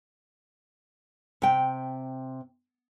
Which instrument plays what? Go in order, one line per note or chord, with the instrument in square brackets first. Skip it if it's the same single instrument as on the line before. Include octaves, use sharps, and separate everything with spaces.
[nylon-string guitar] C3 G5